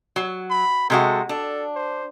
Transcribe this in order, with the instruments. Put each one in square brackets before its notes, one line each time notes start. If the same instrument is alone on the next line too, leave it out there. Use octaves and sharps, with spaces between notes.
[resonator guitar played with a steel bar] F#3
[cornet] B5
[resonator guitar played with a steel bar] C3 G#3 F#4 [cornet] A4
[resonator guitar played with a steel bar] D4 [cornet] A4
[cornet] C5